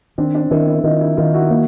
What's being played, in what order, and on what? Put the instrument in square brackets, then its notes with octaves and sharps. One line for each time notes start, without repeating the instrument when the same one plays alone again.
[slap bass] D#3 [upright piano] C4 D4
[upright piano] C4 D4
[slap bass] D#3 [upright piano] D4 E4
[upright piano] D4 E4
[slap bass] D#3 [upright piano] D#4 F4
[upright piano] D4 E4
[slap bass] D#3 [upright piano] D#4 F4
[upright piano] E4 F#4
[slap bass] A#3 [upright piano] E4 F#4